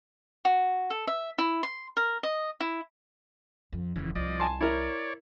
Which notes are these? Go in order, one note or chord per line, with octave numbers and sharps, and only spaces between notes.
F#4
A4
E5
E4
C6
A#4
D#5
E4
F2
E1 F2 C#3 E3
C2 F3 D5 D#5
G#5 A5 C6
E4 A#4 C#5 D5